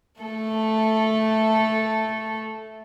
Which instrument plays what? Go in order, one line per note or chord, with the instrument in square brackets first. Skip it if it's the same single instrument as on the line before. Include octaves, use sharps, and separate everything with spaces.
[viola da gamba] A3 A4